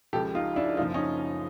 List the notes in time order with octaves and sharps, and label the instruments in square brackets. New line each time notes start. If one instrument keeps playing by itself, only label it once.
[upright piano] C#2 C#3 F3 G4 A4
D#4 F4
D4 E4
F#1 F#2 C#3 F3 D#4 F4
C#4 D#4